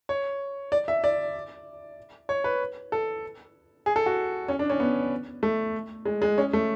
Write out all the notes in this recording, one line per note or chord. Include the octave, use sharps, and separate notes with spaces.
C#5
D5
E5
D5
C#5
B4
A4
G#4
A4
F#4
C#4
D4
C#4
B3
A3
G#3
G#3
C#4
A3